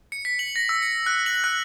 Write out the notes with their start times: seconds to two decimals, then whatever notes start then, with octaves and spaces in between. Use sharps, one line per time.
0.12 C#7
0.25 B6
0.39 F#7
0.56 A#6
0.69 E6
0.82 C#7
1.06 F#6
1.26 F#7
1.44 F#6